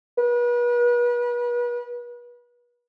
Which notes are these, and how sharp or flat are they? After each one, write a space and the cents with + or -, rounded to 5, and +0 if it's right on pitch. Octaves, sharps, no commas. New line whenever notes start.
B4 -40